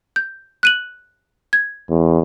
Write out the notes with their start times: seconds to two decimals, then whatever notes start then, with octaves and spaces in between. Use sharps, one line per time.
0.16 G6
0.63 F#6 D#7 F#7
1.53 G#6
1.89 E2